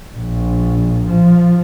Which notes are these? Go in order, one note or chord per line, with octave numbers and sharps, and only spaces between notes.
A#1
F3